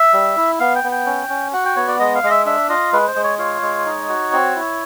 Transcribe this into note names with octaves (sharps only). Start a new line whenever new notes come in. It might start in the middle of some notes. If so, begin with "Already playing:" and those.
Already playing: E5
G3
E4
B3 F5
G5
B3
G5
C#4
C#4
F#4 F#5
G5
B3 C#5
D5
G#3 D#5
F5
G#3 D#5
E5
D4 E5
F4 D#5
G#3 B4
C5
G#3
C#5
F4 C#5
G#3
D#4
F#4
C4
E4